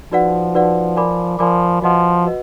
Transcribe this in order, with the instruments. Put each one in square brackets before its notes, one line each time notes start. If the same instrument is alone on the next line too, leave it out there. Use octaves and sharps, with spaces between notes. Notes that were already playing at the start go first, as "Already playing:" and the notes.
[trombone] F3 [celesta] D#4 F#4 B4 D5 F#5
[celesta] D#4 F#4 B4 D5 F#5
A#4 D5 G#5 B5 D6
[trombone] F3 [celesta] A#4 D5 G#5 B5 D6
[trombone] F3 [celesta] F#4 B4 D#5 F#5
[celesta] F#4 B4 D#5